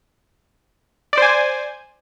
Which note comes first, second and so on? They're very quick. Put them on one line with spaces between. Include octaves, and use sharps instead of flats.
D5 C5 G#5